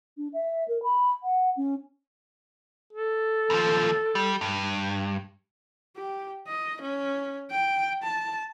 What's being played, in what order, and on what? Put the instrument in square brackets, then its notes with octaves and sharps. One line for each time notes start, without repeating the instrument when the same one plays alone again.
[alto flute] D4
E5
A#4
B5
F#5
C#4
[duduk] A4
[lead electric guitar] D#2 F3
G3
G2
[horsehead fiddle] G4
D#5
C#4
G5
A5